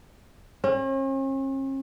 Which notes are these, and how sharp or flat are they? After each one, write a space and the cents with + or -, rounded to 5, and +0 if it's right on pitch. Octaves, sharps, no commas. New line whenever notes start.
C#4 -45